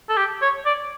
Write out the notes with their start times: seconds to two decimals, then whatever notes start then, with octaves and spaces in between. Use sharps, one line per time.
0.09 A4
0.17 G4
0.42 C#5
0.66 D5